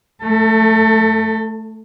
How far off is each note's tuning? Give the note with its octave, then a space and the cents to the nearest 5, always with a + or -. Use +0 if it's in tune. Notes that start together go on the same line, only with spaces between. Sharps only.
A3 +0 A4 +30